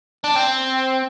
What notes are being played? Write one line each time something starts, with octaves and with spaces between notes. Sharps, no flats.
D4
C4